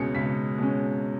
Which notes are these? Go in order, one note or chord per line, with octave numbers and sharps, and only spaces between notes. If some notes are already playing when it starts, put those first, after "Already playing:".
Already playing: C#2 B2 G#3 C#4 C#7
C#2 B6
B2 G#3 C#4